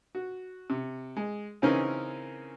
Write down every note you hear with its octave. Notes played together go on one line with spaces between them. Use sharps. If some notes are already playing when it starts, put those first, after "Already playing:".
F#4
C3
G#3
C#3 E3 C4 C#4 D#4 A#4